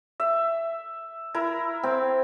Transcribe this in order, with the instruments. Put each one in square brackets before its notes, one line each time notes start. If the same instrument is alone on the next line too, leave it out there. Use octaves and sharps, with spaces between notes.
[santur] E5
E4 A#4
[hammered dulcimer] C4